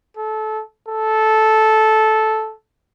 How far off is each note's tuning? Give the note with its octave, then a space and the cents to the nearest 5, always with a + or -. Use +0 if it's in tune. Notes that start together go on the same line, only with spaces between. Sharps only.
A4 -20
A4 -10